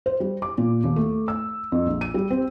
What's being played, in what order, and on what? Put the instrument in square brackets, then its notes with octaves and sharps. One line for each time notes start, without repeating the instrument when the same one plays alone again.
[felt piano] C5
G3
D6
A#2
D#2
A3
E6
F2
A#1
D#7
G3
C4